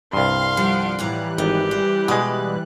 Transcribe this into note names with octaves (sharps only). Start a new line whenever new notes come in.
C2 G2 F5 C6
F3 G3 F#5 D7
A2 E3 G3 F5 A#5 F#6
G#1 D#4 G4
C5
B2 G#3 B4